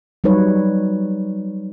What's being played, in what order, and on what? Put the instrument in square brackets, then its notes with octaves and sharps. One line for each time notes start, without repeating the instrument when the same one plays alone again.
[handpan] F#3 G3 D#4 B4 C#5